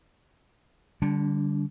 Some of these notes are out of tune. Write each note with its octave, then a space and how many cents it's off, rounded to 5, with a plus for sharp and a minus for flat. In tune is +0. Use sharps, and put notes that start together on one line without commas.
D3 +0 G3 +0 D4 -35